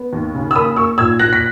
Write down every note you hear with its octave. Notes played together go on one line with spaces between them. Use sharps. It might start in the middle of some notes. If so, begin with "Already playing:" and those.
Already playing: B3
D#2
C#3
E6
A#3 B5 D#6
A#3 C#6 E6
A#2 E6 G#6
A#2 F#6 A#6
B6